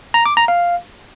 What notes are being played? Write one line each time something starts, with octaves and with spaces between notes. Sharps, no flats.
A#5
D6
A#5
F5